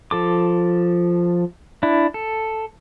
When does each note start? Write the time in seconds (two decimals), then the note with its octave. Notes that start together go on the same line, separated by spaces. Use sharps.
0.11 F3 A4 D6
1.83 D4 E4
2.14 A4